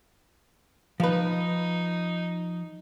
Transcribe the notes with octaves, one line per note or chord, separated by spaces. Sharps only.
F3 D#4 B4